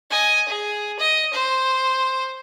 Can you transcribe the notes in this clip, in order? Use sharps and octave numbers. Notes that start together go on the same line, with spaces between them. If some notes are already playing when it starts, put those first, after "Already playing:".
D#5 G#5
G#4
D#5
C5